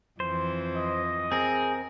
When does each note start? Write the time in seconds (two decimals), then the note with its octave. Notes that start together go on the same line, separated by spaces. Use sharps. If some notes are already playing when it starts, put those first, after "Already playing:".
0.20 F2 E3 C5
0.77 D#5
1.32 C4 G#4 A#4